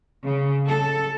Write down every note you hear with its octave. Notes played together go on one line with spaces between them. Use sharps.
C#3
A4